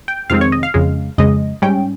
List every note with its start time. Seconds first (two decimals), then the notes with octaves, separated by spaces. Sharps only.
0.08 G5
0.30 F2 C3 D#3 G#3 C4 F5
0.41 C#5
0.52 D#5
0.63 F5
0.74 F2 C#3 G#3
1.18 F2 C#3 G#3 D#5
1.62 G#2 G3 C#4 G5